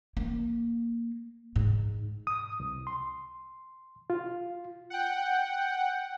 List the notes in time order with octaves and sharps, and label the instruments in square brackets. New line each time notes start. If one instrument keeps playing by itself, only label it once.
[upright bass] A#3
G#2
[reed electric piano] D#6
C2
C6
F4
[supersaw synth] F#5 G5